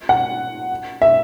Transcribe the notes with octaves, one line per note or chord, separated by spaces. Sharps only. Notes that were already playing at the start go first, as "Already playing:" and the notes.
F#5
E5